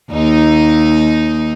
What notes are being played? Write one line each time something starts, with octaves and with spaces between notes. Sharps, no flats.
D#2 D#4